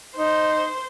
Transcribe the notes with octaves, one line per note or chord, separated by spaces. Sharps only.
D#4 C5